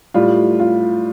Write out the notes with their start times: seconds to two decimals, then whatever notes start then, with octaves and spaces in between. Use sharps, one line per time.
0.14 A2 G3 F4
0.60 F4